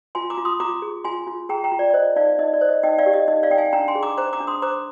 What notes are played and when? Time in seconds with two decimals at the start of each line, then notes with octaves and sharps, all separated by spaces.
0.15 F4 G#5 C6
0.30 A#5 D6
0.38 F4
0.45 C6 D#6
0.60 F4 A#5 D6
0.82 G#4
1.04 F4 G#5 C6
1.27 F4
1.49 G#4 G5 A#5
1.64 G5 A#5
1.72 F4
1.79 D5
1.90 D5
1.94 C5 D#5
2.16 D#4 D5 F5
2.39 D#4 D#5
2.54 D5
2.61 C5
2.69 D#5
2.83 D#4 D#5 G5
2.99 D5 F5
3.06 G4
3.13 D#5
3.28 D#4 D#5
3.43 D5 F5
3.51 D#4 G5
3.58 F5 G#5
3.73 D4 G5 A#5
3.88 G#5 C6
3.95 G#4
4.03 A#5 D6
4.18 C5 A#5 D6
4.33 A#5 D6
4.40 D4
4.47 C6 D#6
4.62 C5 A#5 D6